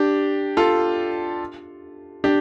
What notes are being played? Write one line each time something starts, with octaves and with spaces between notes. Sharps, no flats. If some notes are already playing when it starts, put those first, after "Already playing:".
Already playing: D4 G4
F4 A4
D4 G4